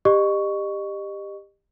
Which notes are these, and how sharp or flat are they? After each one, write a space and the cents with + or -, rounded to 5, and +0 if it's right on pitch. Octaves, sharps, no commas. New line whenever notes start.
G4 +20 D#5 -30 C#6 +10